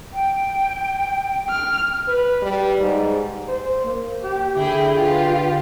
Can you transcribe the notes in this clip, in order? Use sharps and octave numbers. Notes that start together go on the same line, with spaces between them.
G5
F6
B4
G3
G#2
C5
A#3
G4
D3 E4 G#4 G5
F4 G4 B4